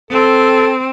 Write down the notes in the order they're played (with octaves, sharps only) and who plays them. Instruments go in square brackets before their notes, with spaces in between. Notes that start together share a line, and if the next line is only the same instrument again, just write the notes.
[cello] C4 [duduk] A4